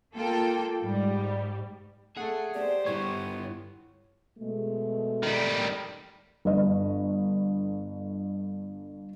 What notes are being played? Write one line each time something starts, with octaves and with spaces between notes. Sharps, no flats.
A#3 F4 A4 G5
G#2 G3
A3 G#4 A4 F#5
G4 C5 D5
G2 B3 E4 C#5
B2 G#3 A3
D#3 G3
G1 D#5